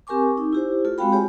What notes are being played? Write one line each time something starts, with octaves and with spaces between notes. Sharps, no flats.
C4 G4 A#4 G#5 C#6 D6
D#4
E4 G4 C5
A3 F4 A4
G#3 C4 F#4 F5 G5 B5
G4 G#4 C#5 G#5